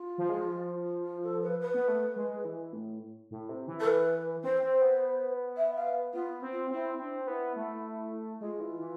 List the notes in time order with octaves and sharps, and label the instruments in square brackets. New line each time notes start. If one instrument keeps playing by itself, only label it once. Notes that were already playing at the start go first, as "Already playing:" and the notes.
Already playing: [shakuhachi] F4
[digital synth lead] F3
G#3
F3
[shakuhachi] F4
A4
B4
B4
[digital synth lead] B3
A3
G#3
E3
A2
A2
C3
E3
[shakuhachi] A4
B4
[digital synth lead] C4 [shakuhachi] C5
[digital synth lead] C4
B3
[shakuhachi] E5
F5
[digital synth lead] B3 [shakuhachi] F4
[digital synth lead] C4
[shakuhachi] F4
[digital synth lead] C4 [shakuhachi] E4
[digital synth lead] C4 [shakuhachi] D4
[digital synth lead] B3 [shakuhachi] E4
[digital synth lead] A3
[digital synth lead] G#3 [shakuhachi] F4
[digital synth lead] E3
E3